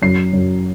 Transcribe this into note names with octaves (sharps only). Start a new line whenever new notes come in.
F#2 C7
F#2